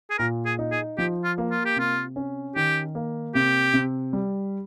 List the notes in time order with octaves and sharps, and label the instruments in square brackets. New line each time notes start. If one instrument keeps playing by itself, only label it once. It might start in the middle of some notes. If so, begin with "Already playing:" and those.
[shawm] G#4
[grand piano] A#2 [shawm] A#4
[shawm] G#4
[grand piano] D#4
[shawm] G#4
[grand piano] F3 [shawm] G4
[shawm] F4
[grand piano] A#3
[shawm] F4
G4
[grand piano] C3 [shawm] F4
[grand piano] C#4
[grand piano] D#3 [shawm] G4
[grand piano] A#3
[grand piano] C3 [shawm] G4
[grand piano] C3
G3